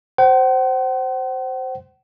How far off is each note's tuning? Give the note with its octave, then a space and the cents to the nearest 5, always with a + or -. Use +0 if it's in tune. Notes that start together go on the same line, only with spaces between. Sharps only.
C5 +0 F#5 +45